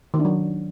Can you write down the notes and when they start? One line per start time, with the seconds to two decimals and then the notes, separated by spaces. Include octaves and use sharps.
0.14 D#3
0.19 D4
0.25 F#3